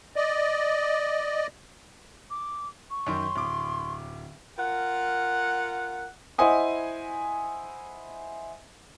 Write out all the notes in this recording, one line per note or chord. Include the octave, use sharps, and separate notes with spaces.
D5 D#5
D6
C#6
F#2 D#3 C6
D1 D6
F4 A#4 F#5
E4 C5 D#5 F#5 G#5 D#6